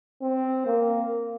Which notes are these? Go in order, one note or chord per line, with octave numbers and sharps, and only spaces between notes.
C4
A#3